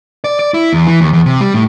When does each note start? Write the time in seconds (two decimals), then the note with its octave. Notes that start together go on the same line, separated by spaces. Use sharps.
0.24 D5
0.39 D5
0.54 E4
0.73 E2
0.87 E3
1.01 D#2
1.13 E2
1.26 C3
1.41 G3
1.54 A2